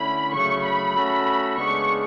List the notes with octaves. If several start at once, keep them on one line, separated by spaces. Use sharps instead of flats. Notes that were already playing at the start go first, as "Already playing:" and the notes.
Already playing: D3 A3 C#4 E4 B5
C#3 F#3 A3 C#6
B5
A3 C#4 F#4 A4
C#3 G#3 B3 D4 G#4 C#6